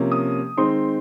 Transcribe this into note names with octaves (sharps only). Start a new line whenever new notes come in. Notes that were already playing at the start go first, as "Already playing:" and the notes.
Already playing: C3 F3 A#3 C#4
D#6
D#3 G#3 C4 D#4 C6